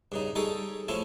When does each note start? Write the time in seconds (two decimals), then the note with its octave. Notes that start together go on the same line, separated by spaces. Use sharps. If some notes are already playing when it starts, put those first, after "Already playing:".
0.12 G2 C#3 D#4
0.35 G3 D#4 G#4 A4 C#5
0.88 F3 A3 C#4 E4 F4